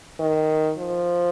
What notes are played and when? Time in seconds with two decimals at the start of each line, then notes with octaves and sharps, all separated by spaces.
0.19 D#3
0.78 F3